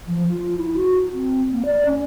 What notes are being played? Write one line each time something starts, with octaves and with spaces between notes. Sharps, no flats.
F3
F4
E4
F#4
C4
A#3
D5
C#4